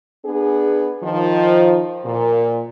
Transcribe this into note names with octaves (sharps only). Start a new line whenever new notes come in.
B3 D4 G#4
D#3 F3
A#2